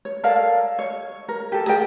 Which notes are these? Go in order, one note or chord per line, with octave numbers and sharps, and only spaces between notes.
C#5
A4 A#4 D5 F5
C#5
A#4
G4 A4
G#4 A#4 G5